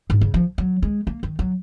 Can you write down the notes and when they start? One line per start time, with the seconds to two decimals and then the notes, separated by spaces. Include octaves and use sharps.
0.10 G#2
0.21 C#3
0.34 F3
0.58 F#3
0.82 G#3
1.07 A#3
1.23 D#3
1.39 F#3